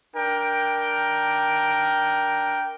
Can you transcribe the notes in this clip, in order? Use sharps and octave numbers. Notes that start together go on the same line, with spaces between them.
D4 A#4 G5